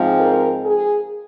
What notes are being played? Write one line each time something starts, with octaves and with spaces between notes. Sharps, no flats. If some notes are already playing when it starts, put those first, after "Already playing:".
Already playing: G#2 F3 G#3 C4
A#4
G#4